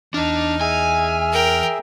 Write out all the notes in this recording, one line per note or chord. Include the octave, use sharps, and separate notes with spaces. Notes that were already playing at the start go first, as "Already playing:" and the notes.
E2 D4 D#4 F6
G#4 E5 G#5
A#4 G5